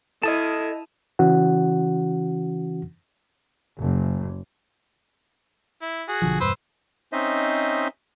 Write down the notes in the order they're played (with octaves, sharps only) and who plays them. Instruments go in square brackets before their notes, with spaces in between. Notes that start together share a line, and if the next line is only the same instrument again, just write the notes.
[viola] E4 [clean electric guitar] A4 D#5 [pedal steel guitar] A5 D#6 F6
[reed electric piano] C#3 E3 C#4 F#4 F#5
[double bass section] F#1
[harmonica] E4
F#4 G#4
[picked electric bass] B1 D3 F3
[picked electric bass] E1 G2 [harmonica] B4 C5 E6
[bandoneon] C4 C#4 D#4 C5 D#5 E5